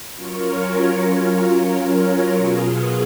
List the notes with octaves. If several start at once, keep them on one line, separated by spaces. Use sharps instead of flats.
F#3 C#4 F4 A#4 C#5
B2 F#3 B3 F4 G#4